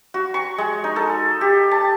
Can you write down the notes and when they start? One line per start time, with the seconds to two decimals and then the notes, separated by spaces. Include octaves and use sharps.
0.14 F#4
0.34 C#6
0.58 G#3
0.84 D#4
0.96 A4
1.41 G4
1.71 A5